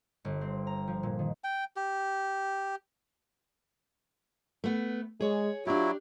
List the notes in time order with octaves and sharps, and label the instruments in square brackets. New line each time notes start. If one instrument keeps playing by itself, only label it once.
[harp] G1
C4
A#5
F3
A#2
D#3
[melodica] G5
G4
[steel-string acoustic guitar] A3 B3
[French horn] G#3 [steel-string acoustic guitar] G#4 C#5
[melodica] F#3 E4 [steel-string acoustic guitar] D4 G4 [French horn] F4